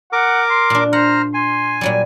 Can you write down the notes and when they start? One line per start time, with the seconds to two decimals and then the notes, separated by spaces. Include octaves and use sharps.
0.13 A#4 F#5 D6
0.50 C6
0.70 A#2 D4
0.93 C5 F#5 A#5 F6
1.34 G#5 C6
1.81 A#2 F#3 G3